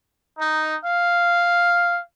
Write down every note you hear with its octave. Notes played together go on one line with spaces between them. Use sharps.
D#4
F5